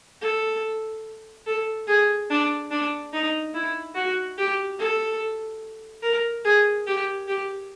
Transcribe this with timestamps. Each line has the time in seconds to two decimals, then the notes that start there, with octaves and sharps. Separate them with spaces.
0.21 A4
1.47 A4
1.88 G#4
2.30 D4
2.71 D4
3.13 D#4
3.54 E4
3.95 F#4
4.38 G4
4.79 A4
6.03 A#4
6.45 G#4
6.87 G4
7.28 G4